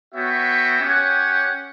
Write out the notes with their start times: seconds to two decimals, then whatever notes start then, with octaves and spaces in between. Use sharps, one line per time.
0.14 B3 F#4 C#5 E5 G5
0.81 C#4 G4 C#5 F#5